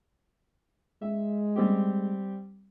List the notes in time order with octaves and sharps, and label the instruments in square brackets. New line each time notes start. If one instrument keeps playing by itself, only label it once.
[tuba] G#3 [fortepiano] E5
[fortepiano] G3 C4 G4